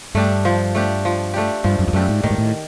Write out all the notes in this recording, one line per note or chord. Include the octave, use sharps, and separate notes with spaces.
G2 A3 D4 G4
F3
A3 D4 G4
F3
A3 D4 G4
G2 F3
F#2
F2
F#2 A3 D4 G4
G#2
A2 D#3
G#2
A2